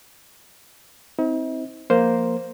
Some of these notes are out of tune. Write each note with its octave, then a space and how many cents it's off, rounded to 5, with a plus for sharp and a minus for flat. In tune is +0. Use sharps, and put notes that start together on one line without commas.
C4 +0 D#4 +45
F3 +0 A#3 +0 C5 +0